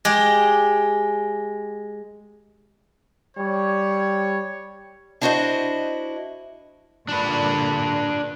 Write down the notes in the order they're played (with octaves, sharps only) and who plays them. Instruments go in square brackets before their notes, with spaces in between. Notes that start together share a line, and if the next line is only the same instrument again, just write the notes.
[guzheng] G#3 G4
[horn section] G3 C#5
[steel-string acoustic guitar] D4 E4 F#4 G4 C5 D#5
[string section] A#2 D3 [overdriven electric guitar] D4 B4